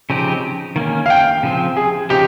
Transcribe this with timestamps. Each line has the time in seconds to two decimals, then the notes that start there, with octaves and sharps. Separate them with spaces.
0.10 C#3 F3 C4 D#4 G4
0.76 D#3 A#3 C#4
1.06 F5
1.10 G5
1.43 C#3 F3 C4
1.77 G#4
2.10 C#3 F3 C4 D#4 G4